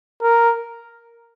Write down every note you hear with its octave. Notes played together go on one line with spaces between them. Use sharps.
A#4